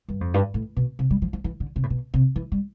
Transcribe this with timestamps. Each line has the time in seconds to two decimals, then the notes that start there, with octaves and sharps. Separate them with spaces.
0.08 G2
0.21 F2
0.34 G2
0.54 A2
0.77 B2
0.99 C3
1.10 G3
1.22 F3
1.33 F3
1.44 E3
1.60 D3
1.76 C3
1.83 A2
1.90 B2
2.14 C3
2.36 E3
2.52 G3